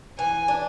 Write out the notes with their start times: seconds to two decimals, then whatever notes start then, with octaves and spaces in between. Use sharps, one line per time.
0.18 E3 G#5
0.48 D4